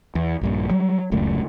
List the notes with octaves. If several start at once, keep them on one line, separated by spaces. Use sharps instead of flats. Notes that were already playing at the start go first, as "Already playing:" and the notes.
E2
A#1 G2 A#2
F#3 G3
D1 C#2 F#2 A3